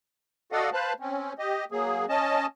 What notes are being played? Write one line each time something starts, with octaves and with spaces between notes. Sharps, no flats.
F#4 A4 D5 D#5 F5 F#5
B4 C5 F5 A5 F#6
C4 C#4
G4 D#5
F#3 A#3 G#4
C#4 D#5 A5